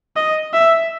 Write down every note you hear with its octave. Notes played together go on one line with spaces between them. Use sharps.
D#5
E5